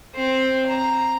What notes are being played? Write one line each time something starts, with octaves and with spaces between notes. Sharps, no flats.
C4 C5
A#5